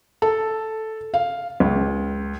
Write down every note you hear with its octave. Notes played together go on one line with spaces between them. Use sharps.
A4
F5
C#2